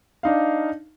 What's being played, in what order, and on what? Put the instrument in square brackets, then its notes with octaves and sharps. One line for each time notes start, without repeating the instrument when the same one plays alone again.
[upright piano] D4 D#4 F5